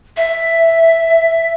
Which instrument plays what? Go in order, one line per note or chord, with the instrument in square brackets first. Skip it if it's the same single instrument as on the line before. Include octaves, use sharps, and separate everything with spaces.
[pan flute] E5